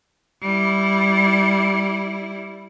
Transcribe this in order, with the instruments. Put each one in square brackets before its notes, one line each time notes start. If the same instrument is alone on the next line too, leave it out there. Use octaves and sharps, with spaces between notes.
[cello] G3 E4